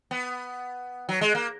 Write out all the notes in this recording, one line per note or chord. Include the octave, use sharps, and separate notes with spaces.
B3
F#3
G#3
A#3